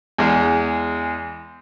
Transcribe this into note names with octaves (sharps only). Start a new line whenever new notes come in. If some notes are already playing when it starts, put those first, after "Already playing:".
E2 G#3